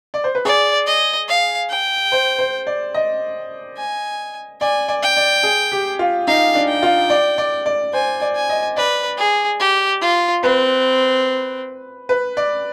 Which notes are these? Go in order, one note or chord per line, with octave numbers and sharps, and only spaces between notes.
D5
C5
B4
G#4 D5
D#5
F5
G5
C5
C5
D5
D#5
G#5
D5 G#5
D5
G5
D5
G#4
G4
F4
D#4 F5
D4
G5
F4
D5
D5
D5
C5 G#5
D5
G#5
D#5
B4 D5
G#4
G4
F4
C4 B4
B4
D5